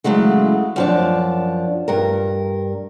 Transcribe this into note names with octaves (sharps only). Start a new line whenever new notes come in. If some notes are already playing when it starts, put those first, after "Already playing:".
C#3 E3 F#3 G#3 A3
F#2 F3 D4
G2 A#4